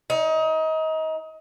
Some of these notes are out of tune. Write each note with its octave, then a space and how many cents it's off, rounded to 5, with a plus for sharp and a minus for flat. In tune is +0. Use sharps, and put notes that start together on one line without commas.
D#4 +30